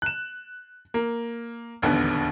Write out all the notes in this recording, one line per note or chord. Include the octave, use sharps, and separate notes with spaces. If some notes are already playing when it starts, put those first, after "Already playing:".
F#6 E7
A#3
E1 A#1 D#2 D3 B3